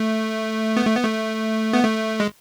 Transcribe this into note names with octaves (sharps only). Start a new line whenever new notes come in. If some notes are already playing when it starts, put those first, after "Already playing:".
Already playing: A3
B3
A3
B3
A3
B3
A3
G#3